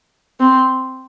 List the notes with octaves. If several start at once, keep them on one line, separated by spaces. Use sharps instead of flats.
C4